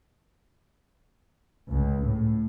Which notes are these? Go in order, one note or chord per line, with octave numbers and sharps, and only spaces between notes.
C#2
A2